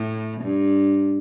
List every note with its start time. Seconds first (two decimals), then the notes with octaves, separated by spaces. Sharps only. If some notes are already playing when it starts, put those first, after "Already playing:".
Already playing: A2
0.41 G2